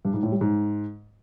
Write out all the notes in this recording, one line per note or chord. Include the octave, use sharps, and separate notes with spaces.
G2
G#2
A2
G3
G#2